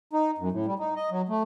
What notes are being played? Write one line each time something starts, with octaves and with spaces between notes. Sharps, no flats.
D#4
F#2
A2
G3
D#4
D#5
F#3
A3